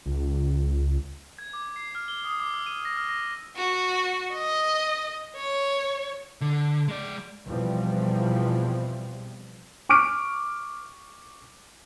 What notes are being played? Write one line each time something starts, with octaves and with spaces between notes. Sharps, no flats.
C#2
G#6
D6
C7
F6
G7
D#6
D6
E6
D#7
A#6
F6
A#6
F#4
D#5
C#5
D3
G#3 D5
E2 B2 E3 F3 G3 C4
C#6 D6 F6 D7